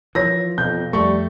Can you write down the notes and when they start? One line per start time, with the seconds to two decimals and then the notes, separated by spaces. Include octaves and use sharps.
0.15 E3 F3 F4 A#4 C#5 A#6
0.58 F2 B2 G6
0.93 F2 G3 A3 C#6